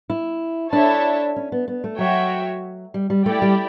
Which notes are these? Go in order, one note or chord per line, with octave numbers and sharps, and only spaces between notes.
E4
D4 E4 A4 C#5 E5 A5
C#4
B3
B3
A3
F#3 F#4 C#5 E5 G5
G3
G3
A3 E4 G4 D5 G5
G3